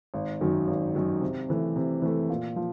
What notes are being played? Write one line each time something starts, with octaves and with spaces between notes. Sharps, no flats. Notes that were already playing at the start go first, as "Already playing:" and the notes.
G#1
F#2 D#3 F#3
G#1
F#2 D#3 F#3
C3
E3 A3
C3
E3 A3
A#2
F3